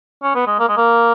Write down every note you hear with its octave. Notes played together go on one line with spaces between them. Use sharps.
C#4
B3
G#3
A#3
G#3
A#3